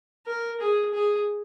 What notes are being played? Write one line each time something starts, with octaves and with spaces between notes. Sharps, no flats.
A#4
G#4
G#4